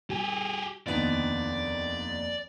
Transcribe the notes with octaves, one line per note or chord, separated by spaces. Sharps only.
G3 G4 G#4
F1 D#2 D3 D#3 B3 D5 D#5